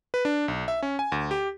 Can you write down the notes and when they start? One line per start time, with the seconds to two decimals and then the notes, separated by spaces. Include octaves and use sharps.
0.14 B4
0.25 D4
0.48 B1
0.68 E5
0.83 C#4
0.99 G#5
1.12 D2
1.31 G4